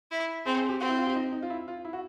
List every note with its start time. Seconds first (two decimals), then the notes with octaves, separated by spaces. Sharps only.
0.11 E4
0.46 C4 G#4
0.57 G#4
0.69 G4
0.80 C4 F#4
0.89 E4
0.98 F4
1.06 G4
1.15 D#4
1.32 D#4
1.42 F4
1.50 E4
1.68 F4
1.85 E4
1.93 F#4